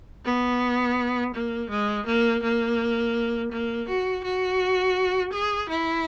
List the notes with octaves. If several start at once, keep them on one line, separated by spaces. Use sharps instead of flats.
B3
A#3
G#3
A#3
A#3
A#3
F#4
F#4
G#4
E4